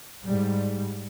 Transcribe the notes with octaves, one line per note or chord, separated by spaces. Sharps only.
G#2 G3